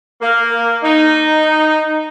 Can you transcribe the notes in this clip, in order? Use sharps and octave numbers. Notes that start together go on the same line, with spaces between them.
A#3
D#4